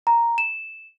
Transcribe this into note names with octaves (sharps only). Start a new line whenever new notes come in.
A#5
E7